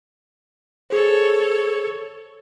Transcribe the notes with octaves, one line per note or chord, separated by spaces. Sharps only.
G#4 A4 C5 C#5